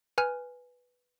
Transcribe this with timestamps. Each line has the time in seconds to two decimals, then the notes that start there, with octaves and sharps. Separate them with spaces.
0.18 B4 G#5 F6